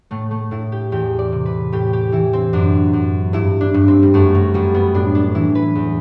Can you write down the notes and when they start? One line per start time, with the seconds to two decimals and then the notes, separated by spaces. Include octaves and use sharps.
0.11 A2 A3
0.31 A3
0.51 A2 E4
0.72 G4
0.92 E2 G4
1.19 D5
1.32 C3
1.46 B4
1.72 A2 G4
1.93 G4
2.12 E3 E4
2.33 C4
2.53 F#2 D4
2.93 F#2
3.33 G2 E4
3.61 D4
3.74 G2
3.88 C4
4.03 G3
4.14 F#2 A3
4.35 F#3
4.54 F#2 G3
4.74 B3
4.94 A2 D4
5.15 D4
5.35 E3 E4
5.55 B4
5.75 E2